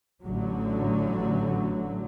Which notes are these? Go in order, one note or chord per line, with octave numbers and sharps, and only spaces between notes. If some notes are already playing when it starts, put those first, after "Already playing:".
A1 D3 F#3